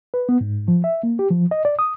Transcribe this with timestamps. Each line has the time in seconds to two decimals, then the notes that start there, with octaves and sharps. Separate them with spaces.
0.14 B4
0.29 B3
0.41 G#2
0.68 F3
0.84 E5
1.03 A#3
1.19 G4
1.31 F3
1.51 D#5
1.65 D5
1.79 D#6